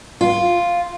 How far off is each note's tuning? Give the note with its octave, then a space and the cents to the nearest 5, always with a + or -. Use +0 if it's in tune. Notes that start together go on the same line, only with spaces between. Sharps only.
F4 +0